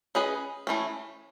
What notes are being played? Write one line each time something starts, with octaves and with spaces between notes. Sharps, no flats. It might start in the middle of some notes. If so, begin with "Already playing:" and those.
C#4 G#4 B4 D#5
E3 A3 C#4